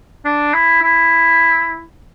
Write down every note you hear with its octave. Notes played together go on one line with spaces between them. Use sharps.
D4
E4
E4